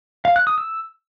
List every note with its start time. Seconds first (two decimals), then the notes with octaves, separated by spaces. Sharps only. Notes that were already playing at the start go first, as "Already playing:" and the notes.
0.25 F5
0.36 F#6
0.47 D#6
0.58 E6